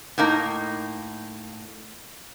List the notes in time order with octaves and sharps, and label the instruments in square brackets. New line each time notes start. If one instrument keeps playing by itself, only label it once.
[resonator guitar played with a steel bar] A2 A#3 D#4 A#5